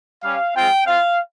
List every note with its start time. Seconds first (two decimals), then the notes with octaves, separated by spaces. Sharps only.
0.23 G3 C#4 G4 F5
0.54 G#3 C4 F4 G5
0.86 C4 F4 F5